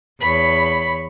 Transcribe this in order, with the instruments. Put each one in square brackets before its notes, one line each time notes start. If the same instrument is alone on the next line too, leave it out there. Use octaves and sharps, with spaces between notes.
[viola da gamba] E2 C#5 [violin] B5